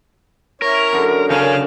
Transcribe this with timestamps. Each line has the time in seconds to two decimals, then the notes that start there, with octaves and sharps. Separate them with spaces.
0.62 C#4 E4 A#4 C#5
0.92 F#2 D3
1.30 C#3 C#4 A#4 F5 A5